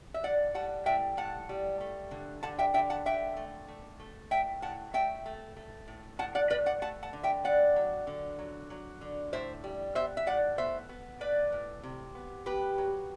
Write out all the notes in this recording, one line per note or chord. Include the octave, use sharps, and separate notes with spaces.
E5
A2 D5 F#5
G3 F#5 A5
A2 E5 G5
A2 F#5 A5
G3
A3
D3
D3 F#5 A5
E5 G5
D3 E5 G5
F#5 A5
D3 E5 G5
A3
A3
A3
A2 E5 G5
A2 F#5 A5
A3 E5 G5
A3
A3
A2
A2 F#5 A5
D5 F#5
A2 B4 D5
D5 F#5
A3 F#5 A5
F#5 A5
D3
E5 G5
A3 D5 F#5
F#3
D3
F#3
F#3
D3
A2 C5 E5
G3
B3 C5 E5
E5
A2 D5 F#5
B3 C5 E5
B3
A2 B4 D5
A2
C3
B3
B3 G4 B4
F#3